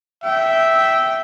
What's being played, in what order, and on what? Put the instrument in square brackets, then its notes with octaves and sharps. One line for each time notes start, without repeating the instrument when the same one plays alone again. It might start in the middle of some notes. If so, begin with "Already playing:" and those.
[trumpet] E5 [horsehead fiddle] G5